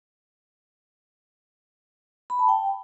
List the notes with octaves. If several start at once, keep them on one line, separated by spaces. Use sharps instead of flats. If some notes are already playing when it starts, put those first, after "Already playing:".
B5
A5
G5